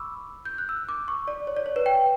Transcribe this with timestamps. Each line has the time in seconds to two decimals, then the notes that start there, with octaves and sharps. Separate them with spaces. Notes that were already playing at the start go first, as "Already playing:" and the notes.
Already playing: B5 C#6 D6 E6
0.45 G6
0.58 F#6
0.69 E6
0.89 D6
1.08 C#6
1.28 D5
1.47 C#5
1.57 D5
1.66 C#5
1.76 B4
1.86 G5